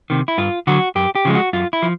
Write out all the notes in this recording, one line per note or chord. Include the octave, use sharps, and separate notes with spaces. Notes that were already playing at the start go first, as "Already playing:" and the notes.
C3 D#3
E4
G2 F4
D3 F#3 F#4
F#2 G4
G4
C#3 F3 G#3
F#4
F#2 F4
E4
F3